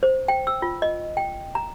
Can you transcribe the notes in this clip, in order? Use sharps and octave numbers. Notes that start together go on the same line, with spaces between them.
C5
G5
E6
F4
D#5
G5
A#5